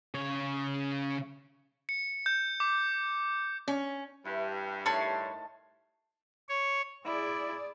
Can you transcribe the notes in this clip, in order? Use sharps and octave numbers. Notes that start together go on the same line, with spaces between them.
C#3 C#5
C#7
G6
D6
C#4
G2 E3
A2 D#3 C#5 A5 B5 C6 A6
C#5
E4 G#4 D5